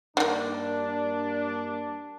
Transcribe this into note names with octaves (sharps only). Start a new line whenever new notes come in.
G2 D3 D#3 A#3 D4